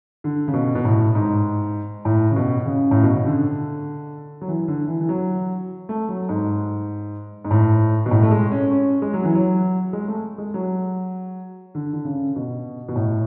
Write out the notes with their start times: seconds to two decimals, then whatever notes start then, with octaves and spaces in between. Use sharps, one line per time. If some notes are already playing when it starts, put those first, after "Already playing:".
0.24 D3
0.48 C#3
0.54 B2
0.75 B2
0.85 A2
1.15 G#2
2.05 A2
2.31 C#3
2.36 B2
2.66 C#3
2.91 A2
3.03 B2
3.16 C#3
3.27 D3
4.42 F#3
4.48 E3
4.68 D3
4.88 E3
5.01 E3
5.09 F#3
5.89 A3
6.09 F#3
6.29 G#2
7.45 G#2
7.51 A2
8.06 B2
8.11 A2
8.23 A3
8.31 G#3
8.52 C#4
8.71 C#4
9.02 G#3
9.13 F#3
9.24 E3
9.35 F#3
9.93 G#3
10.08 A3
10.38 G#3
10.54 F#3
11.75 D3
11.93 D3
12.05 C#3
12.36 B2
12.88 B2
12.96 A2